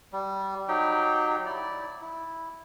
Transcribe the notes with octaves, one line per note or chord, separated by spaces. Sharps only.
G3
F#3 D#4 G4 G5
E4 D5
E4